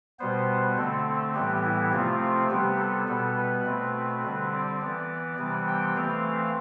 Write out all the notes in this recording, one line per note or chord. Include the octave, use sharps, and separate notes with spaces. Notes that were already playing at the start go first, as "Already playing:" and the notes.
B2 G3 B3 C5
D3 A3 C4 A4
A2 E3 G3 B3 G4
E4
C3 F3 A3 C4 F4
C3 G3 B3 G4
A4
B2 G3 B3
B4
B2 A3 C4
D3 G3 C4 B4
D5
E3 B3 D5
C3 E3 G3 B3
G5
E3 A3 C4 F5